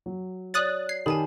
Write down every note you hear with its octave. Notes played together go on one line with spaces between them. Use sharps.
F#3
C#5 D5 D#6 F#6 A6
G#6 C7
D#3 G4 G#5 A5 B5 D#6